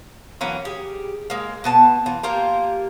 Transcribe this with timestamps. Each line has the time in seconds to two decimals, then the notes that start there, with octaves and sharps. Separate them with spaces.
0.41 E3 F#3 A#3 C#4
0.65 G4 G#4
1.30 G#3 A#3
1.64 B2 B3 A5
2.06 E3 F4
2.23 A#3 F4 G4 A#4